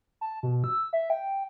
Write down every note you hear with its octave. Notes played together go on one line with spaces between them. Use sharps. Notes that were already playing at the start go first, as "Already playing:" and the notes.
A5
B2
E6
E5
G5